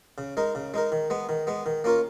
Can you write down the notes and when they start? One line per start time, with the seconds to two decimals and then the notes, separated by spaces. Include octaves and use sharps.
0.18 C#3
0.37 G#3 D#4 A#4
0.55 C#3
0.74 G#3 D#4 A#4
0.92 D#3
1.10 G#3 B3
1.29 D#3
1.47 G#3 B3
1.66 D#3
1.84 A#3 C#4 F4 A#4